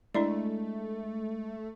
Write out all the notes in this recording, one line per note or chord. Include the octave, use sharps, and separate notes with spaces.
G#3 A3 D4 E4 D5